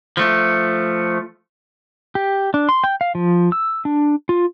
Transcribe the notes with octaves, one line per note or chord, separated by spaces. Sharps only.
F3 A3
G4
D4
C6
G5
F5
F3
E6
D4
F4